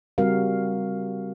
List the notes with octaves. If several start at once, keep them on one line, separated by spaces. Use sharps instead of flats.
C#3 G3 C4 F#4 A#4 F5